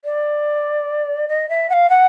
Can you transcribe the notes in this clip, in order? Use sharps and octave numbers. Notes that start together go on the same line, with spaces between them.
D5
D#5
E5
F#5
F5
F#5